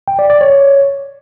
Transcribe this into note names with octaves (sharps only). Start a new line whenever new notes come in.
G5
D5
D5
C#5